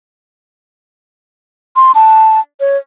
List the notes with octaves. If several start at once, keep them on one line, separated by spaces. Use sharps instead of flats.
C6
A5
C#5